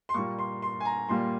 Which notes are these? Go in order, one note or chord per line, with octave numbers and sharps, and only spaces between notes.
C6
A#2 G3 A#3 C#6
C6
C6
G#5
A#5
A#2 G3 A#3 C6